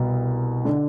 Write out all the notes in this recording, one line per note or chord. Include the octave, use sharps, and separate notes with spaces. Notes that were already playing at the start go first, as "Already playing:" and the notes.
Already playing: C2 B2
D3